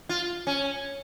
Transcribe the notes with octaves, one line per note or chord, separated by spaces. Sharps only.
F4
C#4